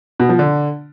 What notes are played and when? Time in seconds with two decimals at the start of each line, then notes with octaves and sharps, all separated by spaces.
0.20 B2
0.29 F3
0.39 D3